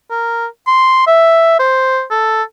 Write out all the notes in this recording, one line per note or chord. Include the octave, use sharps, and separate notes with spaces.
A#4
C6
E5
C5
A4